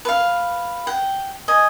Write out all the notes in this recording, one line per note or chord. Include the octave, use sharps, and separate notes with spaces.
B4 F5
F#5 G5
D#5 G#5